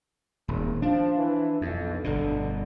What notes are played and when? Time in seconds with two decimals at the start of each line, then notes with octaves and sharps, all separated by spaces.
0.48 D#1 G#1
0.82 F3 D4
1.17 E3
1.61 B1 F2
2.04 G1 B2 D3